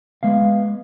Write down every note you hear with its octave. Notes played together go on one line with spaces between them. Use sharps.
G#3 B3 F5